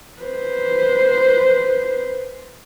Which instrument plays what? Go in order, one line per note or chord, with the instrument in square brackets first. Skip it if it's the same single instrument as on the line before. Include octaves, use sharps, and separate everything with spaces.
[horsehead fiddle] B4 C5